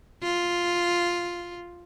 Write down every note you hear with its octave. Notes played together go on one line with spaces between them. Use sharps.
F4